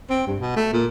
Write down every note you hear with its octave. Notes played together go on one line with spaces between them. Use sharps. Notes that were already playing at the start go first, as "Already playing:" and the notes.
C4
G2
B2
A3
A#2